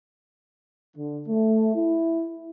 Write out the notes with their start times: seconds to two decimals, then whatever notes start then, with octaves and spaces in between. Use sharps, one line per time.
0.97 D3
1.28 A3
1.75 E4